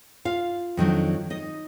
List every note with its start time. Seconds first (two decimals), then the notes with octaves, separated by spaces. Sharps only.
0.25 F4 F5
0.77 F2 D#3 F#3 D4
1.30 D#4 D#5